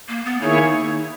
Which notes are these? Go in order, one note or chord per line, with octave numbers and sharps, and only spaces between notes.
A#3
B3
D#3 A#3 D#4 E4 G#4 C#5